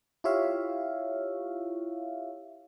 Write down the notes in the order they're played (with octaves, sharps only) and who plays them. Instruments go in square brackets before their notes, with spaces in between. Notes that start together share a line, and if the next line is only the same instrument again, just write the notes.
[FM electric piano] E4 F4 G4 C#5 E5 F5